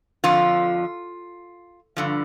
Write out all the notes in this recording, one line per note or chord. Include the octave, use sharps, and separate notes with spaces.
F2 D3 F3 F4
G2 D3 F3